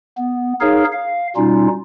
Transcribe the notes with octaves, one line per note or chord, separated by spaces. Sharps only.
B3
D#4 G#4 A#4 C#5 F5
F5
B2 G3 C#4 D#4 F4